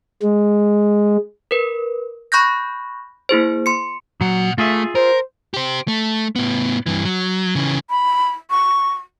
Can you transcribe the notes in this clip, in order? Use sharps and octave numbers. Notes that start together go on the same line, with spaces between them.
G#3
A#4 B4
B5 C#6 F#6 G6 A#6
A#3 E4 G#4 C5
C6 C#7
A#2 F#3 F#5
A3 F4 G#4 E5
A#4 C5
G4 C5
A3
A2 B3
G2 E3
F#3
C#3 E3
B5
C#6